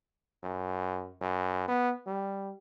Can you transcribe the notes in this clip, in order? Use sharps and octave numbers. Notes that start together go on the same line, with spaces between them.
F#2
F#2
B3
G3